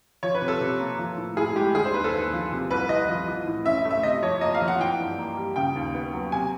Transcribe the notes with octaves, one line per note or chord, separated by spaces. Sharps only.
F3 C#5
B4
C3
A4
C3
A#3
F3
A2
A2 G#4
G#3 G4
D3 G#4
C5
D#2 B4
A4
D#2
F3
C3
C2 B4
C2 D#5
F3
E3
A2
C#4 E5
E5
A3
E5
C3 D#5
F2 C#5
A#3 D#5
F5
F3
F#5
E3 G5
G2
A#3
G3
C#3 G5
D#2
B3
F#3
C3 G#5